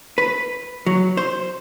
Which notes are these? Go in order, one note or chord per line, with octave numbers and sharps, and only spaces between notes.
B4
F#3
C5